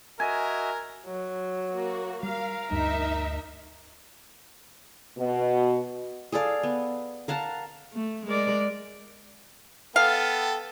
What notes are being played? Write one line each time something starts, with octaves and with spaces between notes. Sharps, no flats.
F#4 A#4 D#5 E5 G#5
F#3
A#3 F#4
G3 A#4 F5
D2 G2 D#4 E5
B2
G#4 A4 D5 F5
B3
A#4 F5 F#5 A5
A3
G#3 A#4 D5
B3 A4 F5 G5